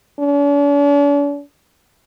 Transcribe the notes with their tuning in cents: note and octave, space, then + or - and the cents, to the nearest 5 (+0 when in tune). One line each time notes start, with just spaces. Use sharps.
D4 -45